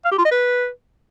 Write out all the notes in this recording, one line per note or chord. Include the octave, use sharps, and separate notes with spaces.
F5
G4
F4
D#5
B4